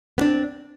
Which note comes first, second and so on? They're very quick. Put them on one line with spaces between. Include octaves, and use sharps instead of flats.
B3 D4 C4